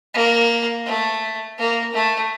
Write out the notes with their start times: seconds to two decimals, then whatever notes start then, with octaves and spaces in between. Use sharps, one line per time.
0.14 A#3
0.85 A3
1.58 A#3
1.93 A3